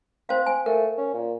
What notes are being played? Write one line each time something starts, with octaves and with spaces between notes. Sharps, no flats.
C4 C5 F5
G#5
A3 A#4
C#4
A#2